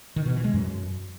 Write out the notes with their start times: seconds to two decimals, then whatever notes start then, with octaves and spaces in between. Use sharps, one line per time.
0.16 D#3
0.26 B2
0.35 E3
0.44 G#3
0.53 F#2